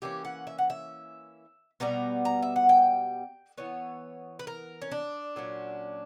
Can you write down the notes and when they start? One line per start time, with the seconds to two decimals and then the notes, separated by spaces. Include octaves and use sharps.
0.02 E3 A#3 C#4 G4
0.25 F#5
0.47 E5
0.58 F#5
0.70 E5
1.80 B2 G3 B3 A#5
2.25 A#5
2.42 E5
2.56 F#5
2.69 G5
3.58 E3 B3 C#5
4.39 B4
4.47 A#4
4.82 C#4
4.92 D4
5.36 A#2 F#3 C#4